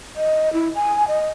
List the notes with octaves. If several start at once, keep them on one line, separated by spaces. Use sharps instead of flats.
D#5
E4
G#5
D#5